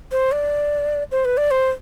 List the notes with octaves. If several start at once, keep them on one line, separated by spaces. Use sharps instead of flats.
C5
D5
C5
B4
D5
C5